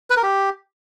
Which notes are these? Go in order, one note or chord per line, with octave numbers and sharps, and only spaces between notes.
B4
A#4
G4